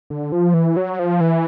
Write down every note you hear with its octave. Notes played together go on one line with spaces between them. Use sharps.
D3
F3
E3
F#3
F3
E3